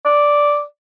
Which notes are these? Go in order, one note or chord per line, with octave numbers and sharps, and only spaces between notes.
D5